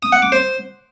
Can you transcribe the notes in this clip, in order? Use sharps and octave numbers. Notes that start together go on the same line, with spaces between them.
D#6
F#5
D6
C5